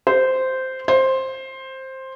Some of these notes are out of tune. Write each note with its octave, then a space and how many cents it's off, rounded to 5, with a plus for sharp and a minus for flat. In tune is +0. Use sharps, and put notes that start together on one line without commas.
C5 -10
C5 +10